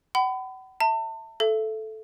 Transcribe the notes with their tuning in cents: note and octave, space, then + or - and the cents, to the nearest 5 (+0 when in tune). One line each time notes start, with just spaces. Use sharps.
F#5 +40 B5 +30
E5 -15 A5 +35
A4 -10 E5 +25